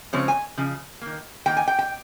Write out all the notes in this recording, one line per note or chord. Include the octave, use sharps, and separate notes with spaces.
C#3 F3 G#3 C4 C#5
G#5
C#3 F3
D#3 A#3
D#3 A#3 G5
G#5
G5
G5